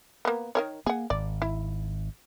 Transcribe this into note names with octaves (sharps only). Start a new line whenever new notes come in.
A#3 B3
D#3 A#4 C#5
A#3 G#4 F#5
G#1 D5
E4